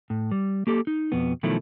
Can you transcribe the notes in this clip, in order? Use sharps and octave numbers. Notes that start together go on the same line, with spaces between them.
A2
G3
A#3 G4 A4
D#4
F2 B2 B3
B2 D#3 F3 F#3 A3 E4